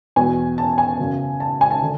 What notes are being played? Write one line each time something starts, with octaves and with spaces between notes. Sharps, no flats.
E2 B2 F#3 G#5
A5
G#5
F#2 C#3 F#3
A5
G#5
A5
D3